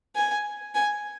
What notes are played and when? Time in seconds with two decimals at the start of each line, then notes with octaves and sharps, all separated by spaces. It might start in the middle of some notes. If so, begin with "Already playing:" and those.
0.16 G#5
0.75 G#5